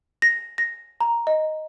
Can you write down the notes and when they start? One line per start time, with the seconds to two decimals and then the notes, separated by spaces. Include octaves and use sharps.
0.22 A#6
0.58 A#6
1.01 A#5
1.27 D#5